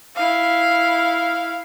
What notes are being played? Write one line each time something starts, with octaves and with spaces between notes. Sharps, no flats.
E4 F5